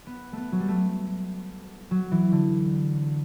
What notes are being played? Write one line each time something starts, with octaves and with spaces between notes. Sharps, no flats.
B3
A3 B3
F#3
G3
A3
F#3
E3
D3